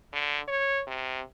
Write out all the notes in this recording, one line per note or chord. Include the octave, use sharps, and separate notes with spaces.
D3
C#5
C3